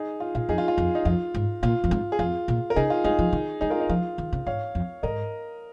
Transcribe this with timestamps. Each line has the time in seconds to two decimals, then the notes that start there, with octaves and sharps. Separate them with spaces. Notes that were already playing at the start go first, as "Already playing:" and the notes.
Already playing: D#4 G#4
0.20 F4
0.35 A#2 F4
0.49 F2 D#4 G#4
0.58 F4
0.68 F4
0.78 F2
0.95 D#4
1.05 F2 F4
1.34 G#2
1.63 A#2 F4
1.84 F2
1.91 G#2
2.12 G#4
2.19 F2 F4
2.48 A#2
2.70 A#4
2.76 C#3 D#4 G#4
2.90 F4
3.04 G#3 D#4 G#4
3.19 F3
3.33 D#3
3.61 G#3 D#4 G#4
3.70 F4 A#4
3.80 D#4
3.89 F3 F4
4.18 D#3
4.33 C#3
4.46 G#2 C#5 F5
4.75 F2
5.03 G#2 A#4 D#5